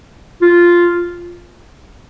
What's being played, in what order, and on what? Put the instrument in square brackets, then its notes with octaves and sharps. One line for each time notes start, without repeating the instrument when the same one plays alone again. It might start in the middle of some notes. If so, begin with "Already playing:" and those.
[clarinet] F4